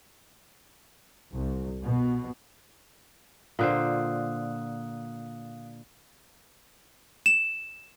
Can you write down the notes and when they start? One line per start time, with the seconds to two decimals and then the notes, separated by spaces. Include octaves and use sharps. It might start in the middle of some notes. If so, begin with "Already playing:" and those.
1.33 C2
1.82 B2
3.59 A#2 D3 C5 F5 D#6 F#6
7.26 E7